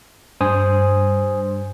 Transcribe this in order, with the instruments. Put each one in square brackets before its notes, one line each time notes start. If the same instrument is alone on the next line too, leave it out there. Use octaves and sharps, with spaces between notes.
[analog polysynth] G2 [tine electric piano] C5 G#5 D#6